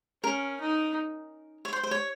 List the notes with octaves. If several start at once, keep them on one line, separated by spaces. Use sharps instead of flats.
C#4 A#4
D#4
C#5
C5
C5
C#5